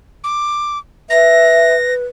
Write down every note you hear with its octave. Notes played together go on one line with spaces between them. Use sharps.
D6
B4 E5 A#6